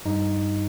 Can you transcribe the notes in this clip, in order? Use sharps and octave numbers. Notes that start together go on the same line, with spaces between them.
G2 D#4